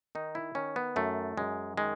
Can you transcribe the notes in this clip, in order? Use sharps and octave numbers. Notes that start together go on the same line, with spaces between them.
D#3 D#4
E4
D#3 C#4
B3
F#2 A3
F#2 G#3
D#3 G#3